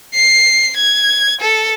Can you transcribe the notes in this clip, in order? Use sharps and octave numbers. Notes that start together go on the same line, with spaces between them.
C7
G#6
A4